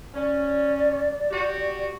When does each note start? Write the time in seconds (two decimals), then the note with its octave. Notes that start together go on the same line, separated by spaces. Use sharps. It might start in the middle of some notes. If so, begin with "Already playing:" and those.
0.15 C#4 D5
1.31 F#4 G4